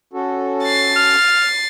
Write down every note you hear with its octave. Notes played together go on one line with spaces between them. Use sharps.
C#4 F#4 A4
A6 C7
F6